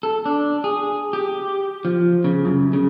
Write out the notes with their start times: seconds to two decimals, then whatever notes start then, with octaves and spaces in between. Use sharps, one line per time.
0.03 A4
0.26 D4
0.64 G#4
1.13 G4
1.85 F3
2.24 C#3
2.45 F#2
2.73 C#3